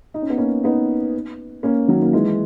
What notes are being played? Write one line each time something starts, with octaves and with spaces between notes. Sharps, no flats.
D#4
C#4
B3
A#3 C#4
B3 D#4
A#3 C#4
D#3 F#3
A#3
E3 G#3